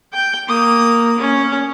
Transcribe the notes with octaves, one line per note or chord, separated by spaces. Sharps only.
G5
A#3 D#6
C#4